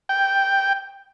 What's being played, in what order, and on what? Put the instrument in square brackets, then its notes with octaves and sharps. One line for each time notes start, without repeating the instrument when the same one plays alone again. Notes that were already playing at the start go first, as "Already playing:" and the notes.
[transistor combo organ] G5